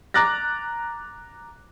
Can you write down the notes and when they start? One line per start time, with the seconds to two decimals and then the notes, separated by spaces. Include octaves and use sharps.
0.14 A#5 D6 F#6 A6 A#6